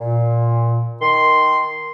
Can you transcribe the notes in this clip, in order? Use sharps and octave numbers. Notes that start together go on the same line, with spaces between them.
A#2
D#3 C6